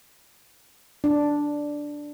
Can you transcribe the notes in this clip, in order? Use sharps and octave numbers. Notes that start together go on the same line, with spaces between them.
D4